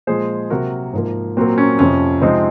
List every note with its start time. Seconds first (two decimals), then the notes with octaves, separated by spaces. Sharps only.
0.07 A#2 F3 G#3 G#4 C5
0.50 C3 F#3 A#3 F#4 A#4
0.93 G#2 F3 A#3
1.37 A#2 F#3 A#3 C4
1.58 C#4
1.79 F2 C3 F3 C#4
2.22 C3 F3 G#3 C4 D#4